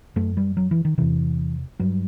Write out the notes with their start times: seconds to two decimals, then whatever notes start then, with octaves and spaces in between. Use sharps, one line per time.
0.16 F#2 A3
0.37 G3
0.57 F#3
0.71 E3
0.85 D#3
0.98 E2 C3 E3
1.79 G2 F#3